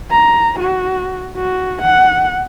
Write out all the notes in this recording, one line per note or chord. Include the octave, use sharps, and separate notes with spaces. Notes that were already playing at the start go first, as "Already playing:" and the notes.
A#5
F#4
F#4
F#5